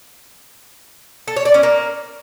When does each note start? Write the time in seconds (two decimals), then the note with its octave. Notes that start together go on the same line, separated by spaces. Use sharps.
1.28 A4
1.36 C#5
1.45 D5
1.54 C#4
1.63 A#3